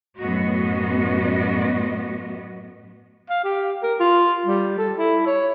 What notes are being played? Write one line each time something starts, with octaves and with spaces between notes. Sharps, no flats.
F#2 A2 A3 B3 F#4 D#5
F5
G4
A#4
F4
G3
A4
E4
C#5